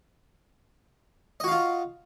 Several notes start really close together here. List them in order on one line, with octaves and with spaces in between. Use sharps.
D#5 F#4 F5 F4